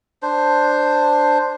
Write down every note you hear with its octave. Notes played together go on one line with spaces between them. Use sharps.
D4 C5